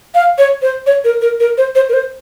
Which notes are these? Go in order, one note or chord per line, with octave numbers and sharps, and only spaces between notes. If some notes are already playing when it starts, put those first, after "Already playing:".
F5
C#5
C5
C#5
A#4
A#4
A#4
C5
C5
A#4
C5